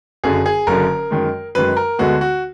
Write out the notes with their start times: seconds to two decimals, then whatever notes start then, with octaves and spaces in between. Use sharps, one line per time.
0.24 F#1 F#2 D3 G#4
0.46 G#4
0.67 F#1 F#2 D3 A#4
1.11 F#2 D#3 G#3
1.55 F#2 D#3 G#3 B4
1.77 A#4
1.99 D2 D3 G#3 B3 F#4
2.21 F#4